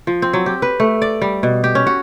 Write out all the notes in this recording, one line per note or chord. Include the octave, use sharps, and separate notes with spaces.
F3
C4
F#3
G4
B4
A3
D5
G3
B2
G4
C#4
F#4